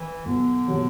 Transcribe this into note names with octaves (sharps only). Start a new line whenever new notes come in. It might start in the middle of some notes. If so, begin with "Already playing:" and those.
Already playing: E3
B1 D3
B2 F#3